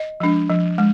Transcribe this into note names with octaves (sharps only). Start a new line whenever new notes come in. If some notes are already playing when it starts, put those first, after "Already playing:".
Already playing: D#5
F3 G#3 D4
F3
G#3